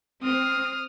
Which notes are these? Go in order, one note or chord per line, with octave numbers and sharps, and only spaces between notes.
C4 D#6 F6